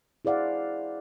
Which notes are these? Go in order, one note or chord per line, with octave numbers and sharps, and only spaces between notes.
E4 G#4 C5 D5 F5 F#5